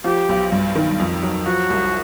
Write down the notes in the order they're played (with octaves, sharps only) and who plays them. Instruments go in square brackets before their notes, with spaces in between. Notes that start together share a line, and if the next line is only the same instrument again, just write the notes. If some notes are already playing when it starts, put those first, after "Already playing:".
[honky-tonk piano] F3 [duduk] G4
[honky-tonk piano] B1
G2
D#3
F2
F#3
[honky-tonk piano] F3 [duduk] F#4
[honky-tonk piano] C2